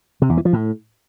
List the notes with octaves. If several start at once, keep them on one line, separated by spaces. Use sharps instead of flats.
C3
E2
E3
F3
A2